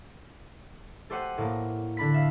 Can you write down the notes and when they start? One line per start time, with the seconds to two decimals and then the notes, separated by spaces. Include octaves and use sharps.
1.10 A3 G4 C5 F#5 D#7
1.38 A2 A#3
1.97 D3 D4 B5 B6
2.14 E5 F5